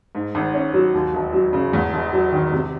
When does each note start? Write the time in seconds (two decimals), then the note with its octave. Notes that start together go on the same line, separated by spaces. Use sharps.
0.15 G#2
0.35 G#1
0.54 C#4
0.74 F#3
0.94 D#2
1.14 E1
1.33 F#3
1.53 C#3
1.73 E2
1.93 E1
2.13 F#3
2.32 D#3
2.52 C3